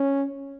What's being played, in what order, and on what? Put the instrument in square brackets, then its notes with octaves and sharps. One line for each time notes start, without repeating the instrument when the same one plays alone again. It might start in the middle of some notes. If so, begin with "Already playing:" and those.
Already playing: [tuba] C#4